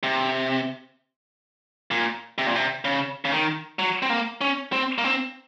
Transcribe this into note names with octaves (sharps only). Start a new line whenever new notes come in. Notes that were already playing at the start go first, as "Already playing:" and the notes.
C3
A#2
C3
A#2
C3
C#3
C#3
D#3
F#3
C4
A#3
C#4
C4
A#3
C4